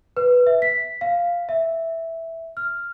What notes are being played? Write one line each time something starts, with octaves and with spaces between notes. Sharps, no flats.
B4
E5
B6
F5
E5
F6